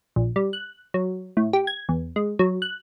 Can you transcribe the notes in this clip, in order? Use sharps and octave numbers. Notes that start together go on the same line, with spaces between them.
A#1
G3
F#6
F#3
A2
G4
G#6
E2
G#3
F#3
F#6